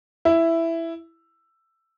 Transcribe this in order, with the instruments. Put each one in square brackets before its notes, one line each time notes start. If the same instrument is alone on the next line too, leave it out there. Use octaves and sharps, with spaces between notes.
[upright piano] E4